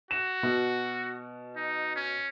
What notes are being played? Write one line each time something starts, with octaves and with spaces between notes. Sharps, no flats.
F#4 E7
B2
D#4
C#4